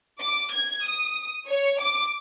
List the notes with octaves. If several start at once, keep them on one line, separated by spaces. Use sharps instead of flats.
D6
G#6
D#6
C#5
D6